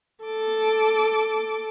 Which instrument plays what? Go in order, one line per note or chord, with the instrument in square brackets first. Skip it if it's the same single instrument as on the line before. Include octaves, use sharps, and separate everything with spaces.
[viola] A4 D6